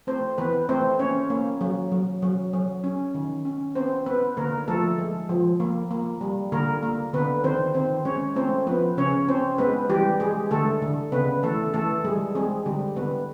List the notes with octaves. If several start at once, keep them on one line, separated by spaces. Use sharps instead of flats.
A3 C4 C5
E3 B3 B4
A3 C4 C5
A#3 C#4 C#5
A#3
F#3
F#3
F#3
F#3
C#4
D#3
C#4
B3 C4 C5
B3 B4
D3 A#3 A#4
F3 A3 A4
G#3
F3
A#3
A#3
G3
D3 A#3 A#4
A#3
D3 B3 B4
D#3 C4 C5
D#3 C4 C5
G#3 C#4 C#5
A3 C4 C5
F3 B3 B4
C#3 C#4 C#5
C4 C5
G#3 B3 B4
E3 G3 G4
G#3 G#4
D3 A3 A4
D3
C#3 B3 B4
E3 A3 A4
E3 A3 A4
G3 G#3 G#4
G#3 C4 G#4
D3 G3 G4
D3 B3 B4